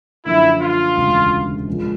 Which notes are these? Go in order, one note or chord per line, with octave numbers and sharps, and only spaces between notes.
F#2 D3 F3 A#3 E4
F4
E1 D2 C#3
A#2 F3 G#3